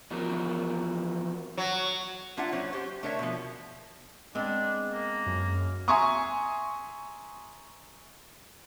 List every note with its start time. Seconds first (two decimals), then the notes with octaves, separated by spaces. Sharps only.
0.11 E3 F3 B3 F4 F#4 A#4
1.58 F#3
2.37 A#3 D4 F4 E5 F#5
2.53 F#3 C#4 C5
2.73 G4 C5
3.03 A3 D4 A#4 C#5 D5 E5
3.19 B2 F3
4.35 G#3 B3 C4 D4
4.92 A#3
5.26 F#2
5.88 E5 G#5 A#5 C6 C#6 D#6